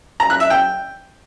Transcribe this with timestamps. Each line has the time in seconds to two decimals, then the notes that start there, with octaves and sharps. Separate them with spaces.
0.20 A#5
0.30 F#6
0.40 E5
0.50 G5